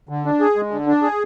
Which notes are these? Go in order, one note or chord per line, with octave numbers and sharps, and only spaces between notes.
D3
D4
G#4
G#3
D3
D4
G#4